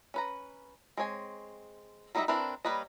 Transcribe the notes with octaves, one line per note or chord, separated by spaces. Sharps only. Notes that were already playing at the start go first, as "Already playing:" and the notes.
C#4 B4 A#5
G#3 C4 C#5 G#5
F#3 G3 D#4 D#5 E5
C4 D4 E4 A#4 B4
G3 A#3 B4 C#5 D#5